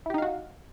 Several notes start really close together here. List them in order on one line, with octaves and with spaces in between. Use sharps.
E4 G4 D#4 F5 F#4